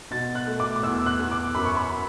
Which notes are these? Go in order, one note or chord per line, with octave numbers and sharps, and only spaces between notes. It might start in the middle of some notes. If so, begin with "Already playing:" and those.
B2 A6
F#6
A3
D6
D6
E2 E6
F#6
E2
D6
F#2 B5
C#6
B5